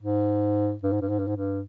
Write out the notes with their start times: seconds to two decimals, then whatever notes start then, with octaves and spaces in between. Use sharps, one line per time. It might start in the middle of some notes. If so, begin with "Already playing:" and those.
0.01 G#2
0.83 G2
0.92 G#2
1.01 G2
1.09 G#2
1.19 G2
1.27 G#2
1.36 G2